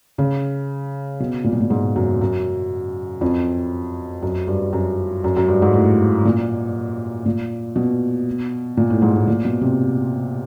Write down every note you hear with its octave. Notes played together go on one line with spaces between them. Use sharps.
C#3
B2
A#2
B2
A#2
G#2
F#2
F#2
F2
F#2
G2
F#2
F#2
F#2
G2
G#2
A2
A#2
A#2
B2
A#2
A2
G#2
A2
A#2
B2
C3